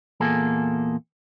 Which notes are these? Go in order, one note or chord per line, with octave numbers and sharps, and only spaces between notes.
E2 A#2 A#3 G#4 A4